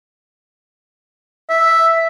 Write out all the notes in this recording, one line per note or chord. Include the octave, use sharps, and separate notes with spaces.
E5